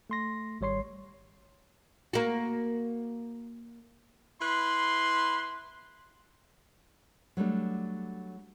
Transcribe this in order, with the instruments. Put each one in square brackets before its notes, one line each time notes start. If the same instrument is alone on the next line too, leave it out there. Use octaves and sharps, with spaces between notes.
[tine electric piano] A3 C6 A#6
G#1 G3 C#5 C6 C7
[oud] A#3 F#4
[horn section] E4 B4 C6
[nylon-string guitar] F#3 G3 A3 D4